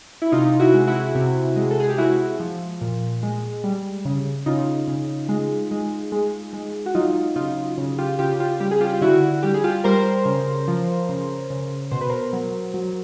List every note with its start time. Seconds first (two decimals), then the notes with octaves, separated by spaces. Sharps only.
0.22 E4
0.32 C3 D#4 F4
0.60 E4 F#4
0.74 G#3
0.87 E4 F#4
1.15 C3
1.56 G#3
1.71 A4
1.80 G#4
1.89 G4
1.98 G#3 E4 F#4
2.40 F3
2.81 A#2
3.23 G#3
3.64 G3
4.05 C#3
4.46 C#3 D#4 F4
4.87 C#3
5.29 G#3
5.71 G#3
6.12 G#3
6.53 G#3
6.86 F#4
6.95 F#3 D#4 F4
7.36 C#3 D#4 F4
7.77 C#3
7.98 F4 G4
8.19 C#3 F4 G4
8.40 F4 G4
8.60 G3 G4
8.71 G#4
8.81 F4 G4
8.93 F4
9.01 D3 E4 F#4
9.43 G3 G4
9.54 G#4
9.64 F4 G4
9.84 G3 A#4 C5
10.25 C#3
10.68 F3
11.09 C#3
11.50 C#3
11.91 B2 C5
12.01 B4
12.10 A#4 C5
12.33 F#3
12.74 F#3